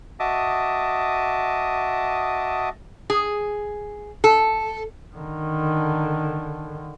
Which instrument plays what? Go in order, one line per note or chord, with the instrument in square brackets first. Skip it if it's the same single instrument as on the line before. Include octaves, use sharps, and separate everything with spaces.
[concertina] F#4 D#5 E5 A5 D6 D#6
[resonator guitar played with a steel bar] G#4
A4
[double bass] D3 D#3